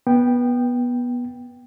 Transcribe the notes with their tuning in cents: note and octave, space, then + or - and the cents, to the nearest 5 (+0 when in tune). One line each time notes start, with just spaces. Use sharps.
B3 -15 G5 +0